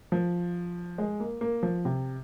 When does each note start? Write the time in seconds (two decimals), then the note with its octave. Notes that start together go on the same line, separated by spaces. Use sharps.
0.12 F3
0.98 G#3
1.20 A#3
1.41 A#3
1.63 F3
1.85 C3